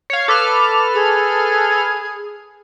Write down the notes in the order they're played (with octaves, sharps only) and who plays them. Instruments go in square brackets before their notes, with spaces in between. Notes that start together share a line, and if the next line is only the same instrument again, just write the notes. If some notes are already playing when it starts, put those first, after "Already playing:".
[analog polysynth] C#5 F5
[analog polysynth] A4 B4 F6 [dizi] D6
[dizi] G#4